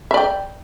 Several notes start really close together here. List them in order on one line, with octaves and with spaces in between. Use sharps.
E5 D5 G5